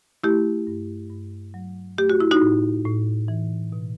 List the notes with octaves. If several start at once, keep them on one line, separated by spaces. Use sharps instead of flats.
A3 E4 G4
G2
G2
F#3
A3 G4
F#4
E4
D#4 F#4
A2
A2
E3
B2